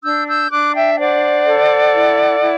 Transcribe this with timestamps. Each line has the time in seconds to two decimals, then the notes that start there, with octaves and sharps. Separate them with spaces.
0.04 D4 E6 G6
0.28 E6 G6
0.51 D4 D6 F#6
0.75 E5 G5
0.94 G5
0.98 C5 D5 F#5
1.46 A4
1.93 E4
2.40 E4